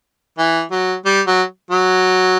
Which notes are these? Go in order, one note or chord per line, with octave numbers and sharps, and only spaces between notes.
E3
F#3
G3
F#3
F#3